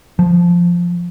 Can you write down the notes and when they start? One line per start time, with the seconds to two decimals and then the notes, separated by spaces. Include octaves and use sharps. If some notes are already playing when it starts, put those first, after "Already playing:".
0.19 F3